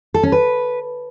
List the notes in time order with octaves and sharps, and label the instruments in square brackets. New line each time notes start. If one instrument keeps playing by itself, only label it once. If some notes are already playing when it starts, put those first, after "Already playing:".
[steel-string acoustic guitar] A4
C#4
B4